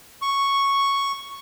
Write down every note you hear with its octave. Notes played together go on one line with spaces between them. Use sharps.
C#6